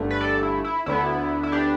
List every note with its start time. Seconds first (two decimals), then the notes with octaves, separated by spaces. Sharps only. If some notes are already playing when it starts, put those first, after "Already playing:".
Already playing: G1 G2 D3 A3
0.11 B4
0.21 A4 D5
0.43 E4
0.64 E4
0.86 D2 D3 B3 E4
1.43 E4
1.52 D4 G4